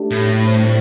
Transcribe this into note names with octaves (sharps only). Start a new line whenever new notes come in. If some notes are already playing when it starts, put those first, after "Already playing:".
Already playing: A3 D4 G4
A2
C3 G3 D4 G4 C5